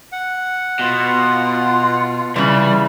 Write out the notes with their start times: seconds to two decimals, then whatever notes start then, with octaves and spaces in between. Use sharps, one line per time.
0.12 F#5
0.79 B2 F4
2.36 C#3 E3 G3 B5